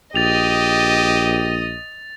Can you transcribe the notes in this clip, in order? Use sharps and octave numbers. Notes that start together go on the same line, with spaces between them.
A#1 G4 D#5 D#6 A6 F7